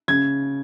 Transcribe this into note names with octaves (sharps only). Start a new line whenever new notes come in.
C#3 G#6